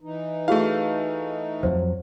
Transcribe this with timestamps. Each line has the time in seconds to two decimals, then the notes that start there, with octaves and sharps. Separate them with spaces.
0.01 E3 D#4
0.48 A3 E4 F#4 G#4 F5
1.63 F2 F#3 C5